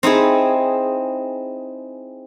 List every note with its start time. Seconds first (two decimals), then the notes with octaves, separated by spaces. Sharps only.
0.03 C4 D#4 E4 G#4